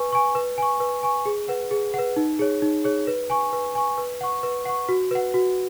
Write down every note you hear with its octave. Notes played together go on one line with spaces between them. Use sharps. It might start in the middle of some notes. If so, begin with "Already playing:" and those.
Already playing: B4 G#5 C#6
G#5 C#6
B4
G#5 C#6
B4
G#5 C#6
G#4
B4 F#5
G#4
B4 F#5
D#4
G#4 C#5
D#4
G#4 C#5
B4
G#5 C#6
B4
G#5 C#6
B4
F#5 C#6
B4
F#5 C#6
F#4
B4 F#5
F#4